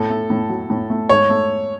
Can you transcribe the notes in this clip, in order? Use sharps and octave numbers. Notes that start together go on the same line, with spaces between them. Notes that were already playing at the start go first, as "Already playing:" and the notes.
Already playing: A2 A4
A3
A2
F#3
A2
A3
G#2 C#5
A3